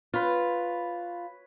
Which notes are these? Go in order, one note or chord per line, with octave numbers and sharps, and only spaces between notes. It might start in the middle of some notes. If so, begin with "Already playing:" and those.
F4 B4 C#5